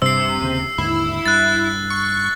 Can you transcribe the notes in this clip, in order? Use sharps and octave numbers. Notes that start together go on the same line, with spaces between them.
G2 C3 E6 C7
D#2 C#3
D#2 G#2 D3 E4
G2 F#6 A6
C#6